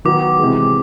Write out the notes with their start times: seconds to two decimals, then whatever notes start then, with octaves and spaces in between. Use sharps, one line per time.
0.05 D#3 F#3 B3 D#4 F#4 D6
0.39 C3 E3 G#3